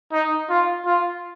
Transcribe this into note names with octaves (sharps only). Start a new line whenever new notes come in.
D#4
F4
F4